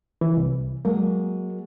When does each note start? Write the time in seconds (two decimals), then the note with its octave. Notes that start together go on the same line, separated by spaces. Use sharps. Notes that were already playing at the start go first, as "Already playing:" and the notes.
0.21 E3
0.37 C2
0.85 F#3 G#3 A#3 A#4